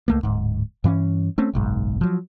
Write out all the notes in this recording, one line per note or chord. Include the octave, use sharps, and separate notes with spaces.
C#2 A3 A#3
D1 G#2
G2 E3 C4 C#4
A3 C4 C#4
F#1 B1 G#2
F3 F#3